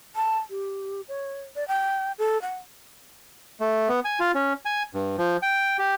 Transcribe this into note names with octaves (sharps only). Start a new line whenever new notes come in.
A5
G4
C#5
D5
G5
A4
F#5
A3
B3
G#5
F4
C#4
G#5
G2
F3
G5
G4